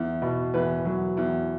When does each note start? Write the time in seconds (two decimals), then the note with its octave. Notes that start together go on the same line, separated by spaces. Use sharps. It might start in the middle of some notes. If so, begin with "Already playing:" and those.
Already playing: E2
0.22 B2
0.54 E2 B4
0.85 F#3
1.17 E2